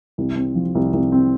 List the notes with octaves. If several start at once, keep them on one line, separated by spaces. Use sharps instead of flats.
C2
C4
F3
C2
C2
C4